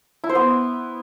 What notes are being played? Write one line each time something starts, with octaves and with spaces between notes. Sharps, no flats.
E4
C5
B3